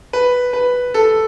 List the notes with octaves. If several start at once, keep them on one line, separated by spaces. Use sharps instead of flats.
B4
B4
A4